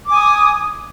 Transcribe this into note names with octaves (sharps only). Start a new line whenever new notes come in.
G#5 D6 D#6